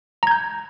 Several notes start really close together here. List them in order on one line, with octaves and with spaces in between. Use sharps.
A#5 G#6 G6